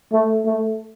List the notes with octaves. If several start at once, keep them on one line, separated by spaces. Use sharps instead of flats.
A3
A3